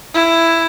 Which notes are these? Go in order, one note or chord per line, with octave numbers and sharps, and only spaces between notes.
E4